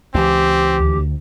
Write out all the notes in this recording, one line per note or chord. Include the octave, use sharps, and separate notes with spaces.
C#2 E3 C4 G4
D2